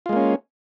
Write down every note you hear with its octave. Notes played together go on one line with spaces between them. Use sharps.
G#3 A#3 C#4 F4